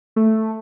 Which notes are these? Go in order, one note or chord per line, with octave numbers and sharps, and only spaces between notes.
A3